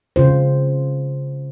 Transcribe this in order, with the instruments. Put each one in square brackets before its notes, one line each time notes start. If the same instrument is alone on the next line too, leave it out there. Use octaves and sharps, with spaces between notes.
[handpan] C#3 F4 C5